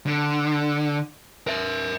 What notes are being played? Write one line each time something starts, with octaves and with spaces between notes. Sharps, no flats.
D3
A#4 E5